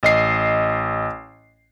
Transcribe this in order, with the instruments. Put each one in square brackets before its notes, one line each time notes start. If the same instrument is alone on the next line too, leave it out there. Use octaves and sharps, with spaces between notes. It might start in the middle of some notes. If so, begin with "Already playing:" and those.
[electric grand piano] A1 D#5 C7